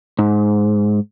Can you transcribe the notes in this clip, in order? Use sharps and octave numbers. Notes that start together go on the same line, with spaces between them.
G#2